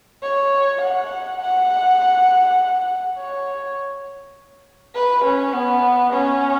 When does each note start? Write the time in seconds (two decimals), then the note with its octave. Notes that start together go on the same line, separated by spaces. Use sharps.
0.23 C#5
0.81 F#5
1.41 F#5
3.18 C#5
4.95 B4
5.24 C#4
5.53 B3
6.13 C#4